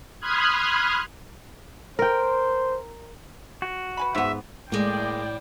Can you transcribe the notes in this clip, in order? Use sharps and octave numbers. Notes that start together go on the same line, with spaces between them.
B5 C6 D#6 F6 F#6 G#6
A#4 C5 G5
F#4
B4 G#5 B5
G#2 F3 B3 E5
A2 G#3 A#3 D5 G5